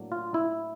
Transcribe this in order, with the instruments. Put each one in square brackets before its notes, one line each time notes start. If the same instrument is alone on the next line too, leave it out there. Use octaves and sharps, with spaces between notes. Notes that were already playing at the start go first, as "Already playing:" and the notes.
Already playing: [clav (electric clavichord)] A2 F#3 A#3 D4
F4
E4